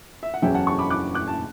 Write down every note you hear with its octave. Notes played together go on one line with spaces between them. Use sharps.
E5
F#5
F#1 E2 C#3 F#3 C#4 E5 G5
F#5 A5
A5 C#6
B5 D6
D6 F#6
D6 F#6
A5